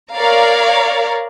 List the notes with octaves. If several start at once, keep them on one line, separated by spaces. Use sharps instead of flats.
A#4 C#5 D5 F5 A#5